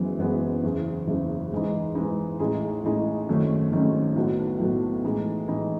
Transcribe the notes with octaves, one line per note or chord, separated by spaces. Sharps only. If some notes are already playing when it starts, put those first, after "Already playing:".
Already playing: F#1 F#2 E3 G#3 B3
F#1 F#2 E3 G#3 B3
F#1 E2 C#3
F#1 E2 C#3
G#2 E3 G#3 D#4
G#2 E3 G#3 D#4
A1 A2 G#3 D#4 G#4
A1 A2 G#3 D#4 G#4
G#1 F#2 D#3 A3 C#4
G#1 F#2 D#3 A3 C#4
B1 A2 F#3 B3
B1 A2 F#3 B3
A2 E3 G#3 D#4
A2 E3 G#3 D#4